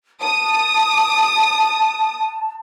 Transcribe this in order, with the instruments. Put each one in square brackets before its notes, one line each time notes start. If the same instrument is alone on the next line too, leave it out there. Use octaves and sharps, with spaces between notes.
[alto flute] A5 [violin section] D#6